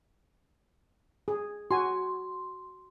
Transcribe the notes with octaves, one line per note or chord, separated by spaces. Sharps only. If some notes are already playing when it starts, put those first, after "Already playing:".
G#4
F#4 G#5 C6